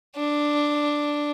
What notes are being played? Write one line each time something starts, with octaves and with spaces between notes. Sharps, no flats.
D4